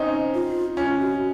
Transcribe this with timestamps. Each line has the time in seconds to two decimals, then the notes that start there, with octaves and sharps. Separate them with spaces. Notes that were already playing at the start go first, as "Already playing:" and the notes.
Already playing: C4 C#4 D#4
0.34 F4
0.77 C#4 F4
0.99 F#4